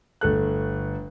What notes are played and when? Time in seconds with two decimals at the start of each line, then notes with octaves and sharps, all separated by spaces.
0.21 G1 A3 F#6